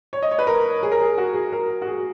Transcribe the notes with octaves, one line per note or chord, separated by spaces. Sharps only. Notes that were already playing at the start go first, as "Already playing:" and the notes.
C#5
D#5
C#5
B4
A#4
G#4
A#4
G#4
F#4
G#4
A#4
F#4
G#4